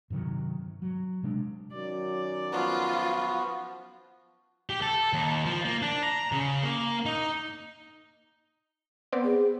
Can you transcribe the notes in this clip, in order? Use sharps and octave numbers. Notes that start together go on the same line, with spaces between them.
G2 C3 D#3 F#3
F#3
C3 G#3 D4
F#2 D#3 F#3 D5
F3 B3 F4 F#4
G4
A4
D#2
F3
A#3
D4
A#5
C#3
A#3
D#4
B3 C4 D5
G#4